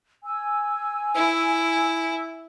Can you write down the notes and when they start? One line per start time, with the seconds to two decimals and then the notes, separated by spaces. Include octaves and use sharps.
0.24 G#5 E6
1.15 E4